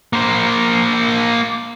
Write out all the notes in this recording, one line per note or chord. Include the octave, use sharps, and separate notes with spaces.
A#3 C5